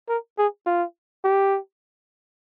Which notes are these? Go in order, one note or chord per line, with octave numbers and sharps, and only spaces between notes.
A#4
G#4
F4
G4